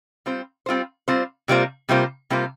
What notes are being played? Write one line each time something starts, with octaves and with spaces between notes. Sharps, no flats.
G3 C4 F4 C5
G3 C4 F4 C5
G3 C4 F4 C5
C3 G3 A#3 F4 C5
C3 G3 A#3 F4 C5
C3 G3 A#3 F4 C5